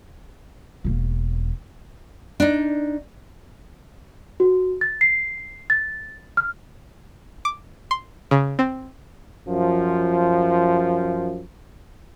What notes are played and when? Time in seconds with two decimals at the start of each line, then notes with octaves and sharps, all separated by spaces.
0.84 E1 A#3
2.40 D4 D#4
4.40 F#4
4.81 A6
5.01 C7
5.70 A6
6.37 F6
7.45 D6
7.91 C6
8.31 C#3
8.59 C4
9.48 F#2 F3